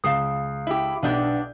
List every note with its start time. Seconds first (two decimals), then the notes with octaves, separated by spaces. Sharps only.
0.04 C#2 F5 D#6 C7
0.67 E4 G4
1.03 B1 B3 D4 G4 G6